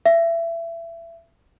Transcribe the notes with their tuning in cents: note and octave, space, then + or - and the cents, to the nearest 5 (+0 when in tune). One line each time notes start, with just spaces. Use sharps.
E5 +25